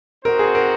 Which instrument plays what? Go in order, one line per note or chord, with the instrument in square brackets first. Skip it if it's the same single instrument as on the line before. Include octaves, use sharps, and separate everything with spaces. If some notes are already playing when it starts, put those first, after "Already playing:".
[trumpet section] C4 D#4 F#4 C5 F#5 [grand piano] A#4
[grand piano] G#4
A#4